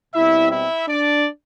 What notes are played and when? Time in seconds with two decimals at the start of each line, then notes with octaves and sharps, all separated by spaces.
0.13 B2 G3 C4 E4 E5
0.50 E4 E5
0.88 D4 D5